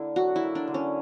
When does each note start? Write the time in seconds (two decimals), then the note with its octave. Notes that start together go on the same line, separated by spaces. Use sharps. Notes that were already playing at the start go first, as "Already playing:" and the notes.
Already playing: D3 A#3 E4
0.16 F#3 F#4
0.36 E4
0.43 A#3
0.55 D4
0.67 D3
0.74 C#4